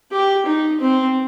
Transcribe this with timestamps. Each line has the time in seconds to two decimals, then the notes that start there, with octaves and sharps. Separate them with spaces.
0.12 G4
0.46 D#4
0.80 C4